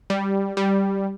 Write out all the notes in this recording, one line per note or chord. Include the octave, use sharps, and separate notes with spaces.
G3
G3